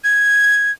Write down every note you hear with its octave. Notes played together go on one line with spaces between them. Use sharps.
G#6